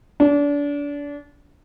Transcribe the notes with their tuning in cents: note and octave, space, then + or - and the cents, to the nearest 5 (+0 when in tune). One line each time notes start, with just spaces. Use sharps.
D4 -30